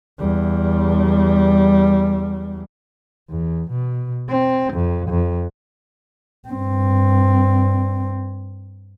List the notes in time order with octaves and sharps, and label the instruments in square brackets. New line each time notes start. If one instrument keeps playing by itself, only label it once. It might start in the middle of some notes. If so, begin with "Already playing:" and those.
[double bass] E2 G3
E2
B2
C4
F2
F2
G2 C4